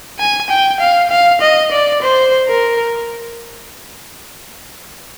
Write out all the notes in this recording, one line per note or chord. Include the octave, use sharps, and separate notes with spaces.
G#5
G5
F5
F5
D#5
D5
C5
A#4